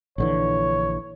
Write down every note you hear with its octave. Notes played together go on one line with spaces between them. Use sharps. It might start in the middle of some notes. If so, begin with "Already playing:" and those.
A#1 D3 E3 C#5